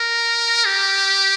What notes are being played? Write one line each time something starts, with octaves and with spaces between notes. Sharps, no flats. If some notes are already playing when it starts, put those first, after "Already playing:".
Already playing: A#4
G4